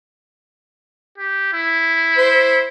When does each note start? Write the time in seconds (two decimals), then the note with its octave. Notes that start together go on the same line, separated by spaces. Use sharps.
1.18 G4
1.53 E4
2.17 C5